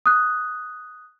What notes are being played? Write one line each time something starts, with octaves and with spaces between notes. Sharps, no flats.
D#6 F#6